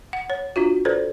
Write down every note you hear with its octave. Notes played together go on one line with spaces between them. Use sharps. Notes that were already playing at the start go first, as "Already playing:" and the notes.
F#5
C#5
D4 F4 F#4
A4 B4 C5 D5